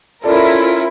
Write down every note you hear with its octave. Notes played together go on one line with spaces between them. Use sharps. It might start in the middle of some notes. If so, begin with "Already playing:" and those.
C#4 E4 F4 A4 A#4 D5